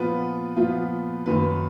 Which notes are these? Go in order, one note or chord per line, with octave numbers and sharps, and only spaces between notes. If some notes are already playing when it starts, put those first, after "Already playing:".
Already playing: A#2 F3 B3 F4 B4
A#2 F3 B3 F4
F#2 D#3 A#3 B4